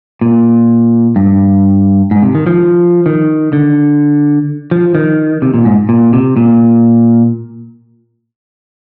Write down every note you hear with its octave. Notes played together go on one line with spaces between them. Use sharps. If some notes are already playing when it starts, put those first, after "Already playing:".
A#2
G2
G#2
C3
D#3
F3
D#3
D3
F3
D#3
C3
A#2
G#2
A#2
C3
A#2